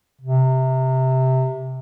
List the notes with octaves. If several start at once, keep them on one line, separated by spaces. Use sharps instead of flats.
C3